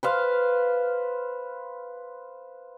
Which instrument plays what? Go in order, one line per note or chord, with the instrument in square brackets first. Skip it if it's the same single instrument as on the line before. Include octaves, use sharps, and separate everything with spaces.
[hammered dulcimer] B4 C5 F5